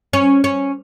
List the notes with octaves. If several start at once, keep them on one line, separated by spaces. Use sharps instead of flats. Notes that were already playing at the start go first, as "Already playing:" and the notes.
C#4
C#4